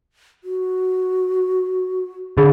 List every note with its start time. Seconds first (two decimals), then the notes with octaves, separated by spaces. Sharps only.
0.44 F#4
2.38 D3 G#4 B5